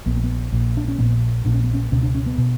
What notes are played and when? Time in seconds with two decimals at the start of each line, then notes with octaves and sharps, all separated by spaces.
0.06 A#1 A#2 B3
0.15 A#3
0.24 B3
0.52 A#1 A#2
0.77 D4
0.88 C#4
0.98 A#1 A#2 B3
1.45 A#1 A#2 D4
1.54 C#4
1.64 B3
1.74 C#4
1.92 C#2 B2 C#4
2.03 D4
2.15 C#4
2.26 B3
2.38 B2